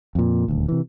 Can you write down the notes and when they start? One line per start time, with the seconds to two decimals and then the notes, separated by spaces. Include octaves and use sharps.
0.15 F2 A#2
0.48 D#1 D2
0.68 C3 E3